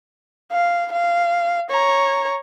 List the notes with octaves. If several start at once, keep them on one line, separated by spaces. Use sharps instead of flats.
F5
F5
C#5 A#5